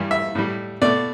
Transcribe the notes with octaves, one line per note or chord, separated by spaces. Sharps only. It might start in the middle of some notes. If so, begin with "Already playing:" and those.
Already playing: G2 E3 G3
E5
A2 G3
B2 A3 D5